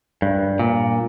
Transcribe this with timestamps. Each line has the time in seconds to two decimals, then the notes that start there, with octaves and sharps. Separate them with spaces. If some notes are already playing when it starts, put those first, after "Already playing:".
0.22 G2
0.59 A#2